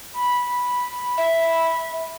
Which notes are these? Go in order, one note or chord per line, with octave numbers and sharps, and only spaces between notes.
B5
E5